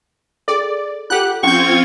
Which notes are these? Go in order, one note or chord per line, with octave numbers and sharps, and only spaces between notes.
G#4 A4 D5
F4 G4 A4 F#5 F#6
F3 C4 C#4 F4 C#6 G6 G#6